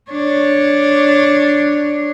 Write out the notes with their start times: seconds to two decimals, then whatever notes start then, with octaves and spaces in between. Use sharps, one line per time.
0.11 D4 C#5